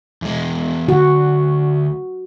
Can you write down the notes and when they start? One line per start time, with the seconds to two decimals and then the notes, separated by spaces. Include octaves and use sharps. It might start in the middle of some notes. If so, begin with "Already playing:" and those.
0.22 E2 G#3
0.89 D2 F#4